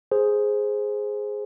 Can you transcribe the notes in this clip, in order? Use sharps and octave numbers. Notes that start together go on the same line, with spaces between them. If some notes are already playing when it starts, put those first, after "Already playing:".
G#4 C5